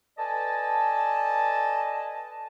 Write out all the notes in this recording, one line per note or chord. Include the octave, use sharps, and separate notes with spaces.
A4 B4 D5 D#5 G#5 A5